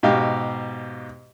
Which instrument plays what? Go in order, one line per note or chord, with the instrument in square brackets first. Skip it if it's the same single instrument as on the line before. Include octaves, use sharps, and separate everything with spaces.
[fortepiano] G#2 B2 G4 F5